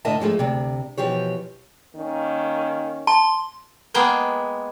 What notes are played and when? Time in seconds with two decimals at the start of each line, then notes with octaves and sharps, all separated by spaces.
0.05 A2 D3 A#4 D#5 E5 A5
0.20 G#2 F3 G#3 A3
0.39 D2 C3
0.98 B2 E3 F3 G4 C#5
1.95 D#3 A#3 C#4
3.07 A5 C6
3.94 G#3 A#3 B3 G#4 G5